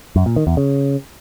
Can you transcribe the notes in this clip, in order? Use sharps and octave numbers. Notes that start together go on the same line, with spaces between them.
F#2
A#2
D#3
E2
C#3